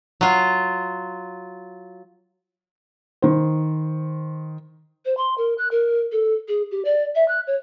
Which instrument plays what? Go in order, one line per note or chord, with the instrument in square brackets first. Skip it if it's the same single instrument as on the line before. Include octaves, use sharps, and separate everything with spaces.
[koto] F#3 F4
[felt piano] D#3 C5
[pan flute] C5
C6
A#4
F#6
A#4
A4
G#4
G4
D5
E5
F#6
C#5